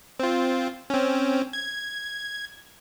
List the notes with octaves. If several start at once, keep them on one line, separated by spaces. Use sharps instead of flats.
C4 F4
C4 C#4
G#6